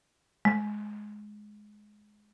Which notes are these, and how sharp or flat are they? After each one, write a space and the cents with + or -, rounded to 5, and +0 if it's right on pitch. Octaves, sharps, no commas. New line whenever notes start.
G#3 +10